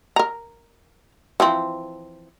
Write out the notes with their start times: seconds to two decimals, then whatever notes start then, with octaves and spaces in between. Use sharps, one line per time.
0.16 A#4 A#5
1.40 E3 F3 C4